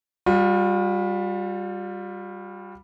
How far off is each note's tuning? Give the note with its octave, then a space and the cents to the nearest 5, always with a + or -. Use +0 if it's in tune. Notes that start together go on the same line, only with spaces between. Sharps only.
G3 +5 F4 +40